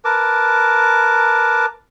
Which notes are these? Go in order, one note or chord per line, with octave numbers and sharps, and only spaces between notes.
A#4 B4 A5 D6